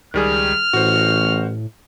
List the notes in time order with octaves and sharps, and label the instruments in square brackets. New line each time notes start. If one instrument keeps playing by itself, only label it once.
[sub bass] C#2 [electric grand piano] D#3 G3 G#4 [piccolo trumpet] F6
[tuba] A1 [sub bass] A2 [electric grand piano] F#4 C5